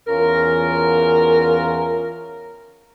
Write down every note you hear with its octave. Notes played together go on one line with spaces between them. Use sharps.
E2 C#4 F4 A#4